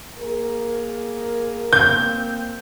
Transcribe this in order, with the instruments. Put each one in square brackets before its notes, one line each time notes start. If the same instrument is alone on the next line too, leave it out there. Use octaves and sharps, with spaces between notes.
[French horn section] A#3 G#4 A#4
[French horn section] A#3 C4 [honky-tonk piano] G6